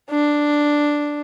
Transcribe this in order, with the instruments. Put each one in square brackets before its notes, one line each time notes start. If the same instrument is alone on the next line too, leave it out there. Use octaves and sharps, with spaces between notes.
[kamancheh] D4